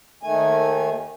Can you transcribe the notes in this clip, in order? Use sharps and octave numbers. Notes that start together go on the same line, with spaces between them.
D#2 D#3 A3 G#5